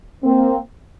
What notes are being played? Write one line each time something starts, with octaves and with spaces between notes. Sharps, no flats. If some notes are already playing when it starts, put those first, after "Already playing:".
A#3 C4